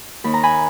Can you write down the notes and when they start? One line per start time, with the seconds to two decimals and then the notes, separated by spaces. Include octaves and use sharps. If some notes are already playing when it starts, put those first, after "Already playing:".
0.24 D#2 B5
0.34 A#5
0.43 G#5 B5